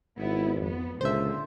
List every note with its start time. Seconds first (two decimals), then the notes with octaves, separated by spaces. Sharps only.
0.18 G#1 B3 E4
0.60 F2 B3
1.01 C#2 A#2 D3 C5 E5